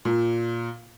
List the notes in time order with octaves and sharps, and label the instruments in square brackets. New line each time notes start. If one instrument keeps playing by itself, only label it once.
[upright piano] A#2